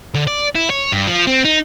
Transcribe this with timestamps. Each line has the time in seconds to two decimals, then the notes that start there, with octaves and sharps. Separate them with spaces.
0.14 D3
0.27 D5
0.55 E4
0.70 C#5
0.92 G2
1.07 F3
1.27 C4
1.44 D#4